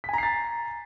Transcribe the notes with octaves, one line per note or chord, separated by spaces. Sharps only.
G#5 A#5 A6 B6 C7